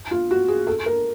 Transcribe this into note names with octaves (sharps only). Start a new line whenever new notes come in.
F4
F#4
G#4
A4
A#4